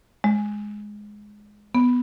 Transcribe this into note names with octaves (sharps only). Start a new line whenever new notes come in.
G#3
B3